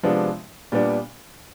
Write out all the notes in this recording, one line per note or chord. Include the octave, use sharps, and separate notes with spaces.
C3 F3 G#3 B3 D4
A#2 G3 B3 D4